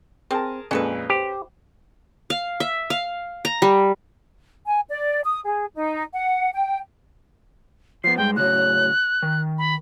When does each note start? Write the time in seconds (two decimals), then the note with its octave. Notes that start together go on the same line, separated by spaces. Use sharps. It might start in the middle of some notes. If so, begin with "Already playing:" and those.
0.31 C4 G#4 A#4 A5
0.71 F2 A#2 G#3 C#4 A4 B4
1.10 G4 C5
2.30 F5
2.60 E5
2.90 F5
3.45 A#5
3.62 G3
4.66 G#5
4.88 D5
5.24 D#6
5.45 G#4
5.74 D#4
6.13 F#5
6.53 G5
8.04 F3 B3 C7
8.17 G2 G#3 G5
8.36 A2 C#3 F#3 F#6
9.23 D#3
9.58 B5